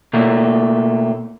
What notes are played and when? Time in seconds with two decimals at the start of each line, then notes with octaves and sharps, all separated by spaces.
0.13 B2 A3 A#3